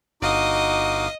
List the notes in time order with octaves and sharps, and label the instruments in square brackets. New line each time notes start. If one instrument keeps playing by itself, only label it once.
[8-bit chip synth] G1 F5 D#6 [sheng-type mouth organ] D#4 F#4 D6 [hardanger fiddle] D#5